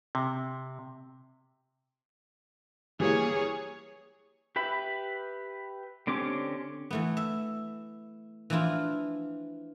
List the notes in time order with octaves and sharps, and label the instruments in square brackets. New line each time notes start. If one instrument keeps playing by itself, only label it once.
[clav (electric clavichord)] C3
[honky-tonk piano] E3 G3 A#3 [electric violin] G#4 C#5
[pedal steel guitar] G4 B4 E5 B5
D3 C4 C#4 G4 D6
[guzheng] E3 A3 B3
E5
E3 F3 D4 E4 F4